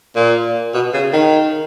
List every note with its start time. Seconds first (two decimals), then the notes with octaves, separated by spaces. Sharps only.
0.16 A#2
0.74 B2
0.94 C#3
1.13 D#3